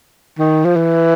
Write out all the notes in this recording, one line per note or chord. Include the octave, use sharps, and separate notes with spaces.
D#3
F3
E3